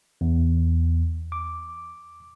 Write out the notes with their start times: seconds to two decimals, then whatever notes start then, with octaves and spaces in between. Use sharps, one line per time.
0.21 E2
1.32 D6